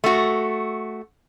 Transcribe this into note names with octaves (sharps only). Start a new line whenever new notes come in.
A3 F#4